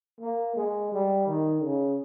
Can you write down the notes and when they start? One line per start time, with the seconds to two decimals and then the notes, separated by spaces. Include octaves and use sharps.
0.21 A#3
0.56 G#3
0.92 G3
1.27 D#3
1.63 C#3